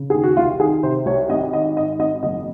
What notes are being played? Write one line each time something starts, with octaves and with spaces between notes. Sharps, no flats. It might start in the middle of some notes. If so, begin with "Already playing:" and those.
Already playing: C#3
D#2 G#4
F#4
C2 F4
D#3 G#4
C3 C5
C2 C#5
G#1 D#5
D#3 D#5
G#2 D#5
G#1 D#5
F#1 D#5